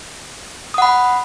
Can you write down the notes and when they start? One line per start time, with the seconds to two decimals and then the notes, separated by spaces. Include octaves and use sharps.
0.74 D#6
0.78 F#5
0.82 B5